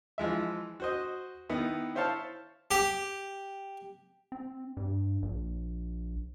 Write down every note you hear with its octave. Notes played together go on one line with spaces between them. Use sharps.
E3 F3 G#3 E5
F#4 C5 D#5
D#3 B3 D#4 E4
E4 C5 C#5 F5 A5
G4
C4
G2
A#1